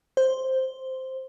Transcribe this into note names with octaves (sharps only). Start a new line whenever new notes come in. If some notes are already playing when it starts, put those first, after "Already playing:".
C5